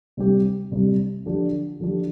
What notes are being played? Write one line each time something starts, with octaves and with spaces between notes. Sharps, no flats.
C3 G3 C4 G4
C3 G3 C4 G4
D3 F3 D4 G4
D3 F3 D4 G4